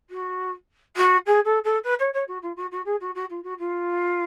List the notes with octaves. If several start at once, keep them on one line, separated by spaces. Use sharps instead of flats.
F#4
F#4
G#4
A4
A4
B4
C#5
C#5
F#4
F4
F#4
F#4
G#4
F#4
F#4
F4
F#4
F4